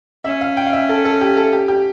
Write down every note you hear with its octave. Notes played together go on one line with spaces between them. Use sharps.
C#4 E5
F5
G5
F5
E5
A4
A4
G4
A4
G4
G4